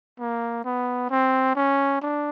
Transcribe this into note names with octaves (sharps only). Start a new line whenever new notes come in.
A#3
B3
C4
C#4
D4